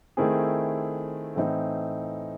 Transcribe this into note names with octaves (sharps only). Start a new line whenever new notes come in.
D#3 A3 C4 E4 G#4
A2 E3 C4 D#4